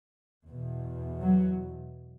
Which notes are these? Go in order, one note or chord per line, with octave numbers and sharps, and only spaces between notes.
E2 B2
F#3